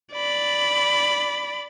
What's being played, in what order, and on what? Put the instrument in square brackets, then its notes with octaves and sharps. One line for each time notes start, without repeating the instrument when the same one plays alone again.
[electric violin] D5 B5